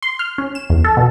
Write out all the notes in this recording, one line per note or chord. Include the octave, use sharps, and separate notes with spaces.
C6
F6
C#4
E7
E2
A4
B2